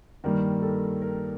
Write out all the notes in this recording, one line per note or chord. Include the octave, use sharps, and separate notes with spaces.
G2 D#3 G3 A#3 A#4
A4
A#4